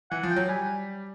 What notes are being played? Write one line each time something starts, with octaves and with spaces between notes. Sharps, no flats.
E3 F#5
F3
G5
F#3
G3 G#5